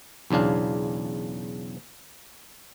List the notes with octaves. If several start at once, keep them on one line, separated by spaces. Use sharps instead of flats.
B1 E2 C#3 D4 F5